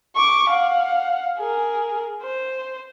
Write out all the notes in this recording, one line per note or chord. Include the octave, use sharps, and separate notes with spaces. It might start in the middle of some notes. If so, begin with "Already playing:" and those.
C#6 D6
F5 F#5
G#4 A#4
C5